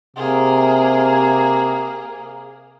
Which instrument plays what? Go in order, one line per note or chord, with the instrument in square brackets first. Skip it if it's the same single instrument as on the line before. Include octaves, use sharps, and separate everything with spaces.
[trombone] C3 [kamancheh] A#3 G#4